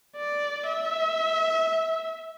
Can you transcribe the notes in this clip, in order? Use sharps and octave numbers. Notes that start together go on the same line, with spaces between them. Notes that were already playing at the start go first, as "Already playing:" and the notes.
D5
E5